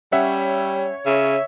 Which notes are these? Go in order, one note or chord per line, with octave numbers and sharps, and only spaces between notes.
G3 C#4 C#5 E5 F#5
C#3 E5